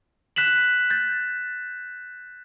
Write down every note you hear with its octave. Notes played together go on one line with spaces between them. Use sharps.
F#6 B6 E7 F#7
G6 A6